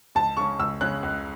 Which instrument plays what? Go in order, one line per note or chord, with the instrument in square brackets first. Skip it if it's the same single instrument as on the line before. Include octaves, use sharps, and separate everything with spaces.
[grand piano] C#2 [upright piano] A5
[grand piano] C#3 G#3 C#4 [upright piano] C#6
[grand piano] C#2 [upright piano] E6
[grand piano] C#3 G#3 C#4 [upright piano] F#6
[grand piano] C#2